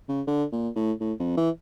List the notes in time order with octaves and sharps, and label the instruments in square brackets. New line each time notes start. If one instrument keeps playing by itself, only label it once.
[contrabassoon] C#3
D3
A#2
A2
A2
F2
E3